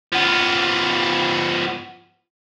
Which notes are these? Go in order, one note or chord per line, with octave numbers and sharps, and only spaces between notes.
F3 B3